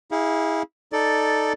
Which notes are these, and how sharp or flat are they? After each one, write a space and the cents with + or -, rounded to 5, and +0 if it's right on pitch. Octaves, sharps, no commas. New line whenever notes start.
E4 -30 G#4 -25 F5 +0
D#4 +0 A4 +0 D5 +0